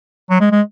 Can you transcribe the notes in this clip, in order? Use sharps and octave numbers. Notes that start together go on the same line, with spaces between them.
F#3
G#3
G#3